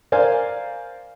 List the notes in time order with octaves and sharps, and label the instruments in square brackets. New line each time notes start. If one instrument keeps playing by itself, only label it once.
[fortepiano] A#4 C5 D5 F5 G#5